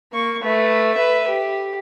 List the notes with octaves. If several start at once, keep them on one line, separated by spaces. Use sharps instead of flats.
A#3 C#6
A3 B4
B4 E5
G4